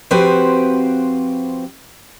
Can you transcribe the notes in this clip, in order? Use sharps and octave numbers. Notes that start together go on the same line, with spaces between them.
F3 C4 F#4 G4 B4 C5